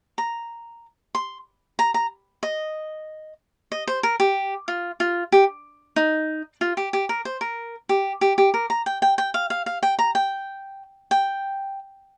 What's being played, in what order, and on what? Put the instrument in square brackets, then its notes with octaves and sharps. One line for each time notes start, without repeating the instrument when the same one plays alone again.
[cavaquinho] A#5
C6
A#5
A#5
D#5
D#5
C5
A#4
G4
F4
F4
G4
D#4
F4
G4
G4
A#4
C5
A#4
G4
G4
G4
A#4
A#5
G5
G5
G5
F5
F5
F5
G5
A#5
G5
G5